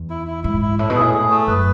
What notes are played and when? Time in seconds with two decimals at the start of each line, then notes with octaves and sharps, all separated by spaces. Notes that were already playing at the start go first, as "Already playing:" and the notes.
Already playing: E2
0.10 E4
0.27 E4
0.44 G#2 E4
0.62 E4
0.79 A2 E4
0.90 B2
0.96 A2 G#4
1.13 G#4
1.30 A3
1.47 F#2 B4